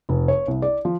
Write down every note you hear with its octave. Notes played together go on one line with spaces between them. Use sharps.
F1
C#5
C2
D5
F3